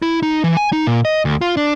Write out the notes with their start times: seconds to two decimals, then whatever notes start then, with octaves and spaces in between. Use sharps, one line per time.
0.02 E4
0.23 D#4
0.44 E3
0.57 G#5
0.73 D#4
0.87 A#2
1.05 D#5
1.25 D2
1.41 F4
1.57 D4